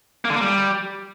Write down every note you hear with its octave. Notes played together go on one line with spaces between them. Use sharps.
A#3
D3
A#3
G3